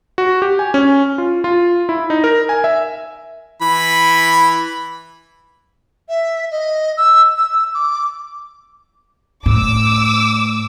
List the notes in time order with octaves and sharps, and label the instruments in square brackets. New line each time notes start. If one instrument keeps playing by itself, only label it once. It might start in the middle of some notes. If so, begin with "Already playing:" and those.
[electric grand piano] F#4
G4
G#5
C#4
F4
F4
E4
D#4
A#4
G#5
E5
[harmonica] E3 B5
[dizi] E5
D#5
E6
E6
D6
[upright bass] A2 [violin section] D6 E6